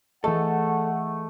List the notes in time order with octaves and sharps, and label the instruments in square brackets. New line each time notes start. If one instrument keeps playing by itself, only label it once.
[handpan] E3 G#4 D#5 [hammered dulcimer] A3 [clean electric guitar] A4 [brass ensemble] F#5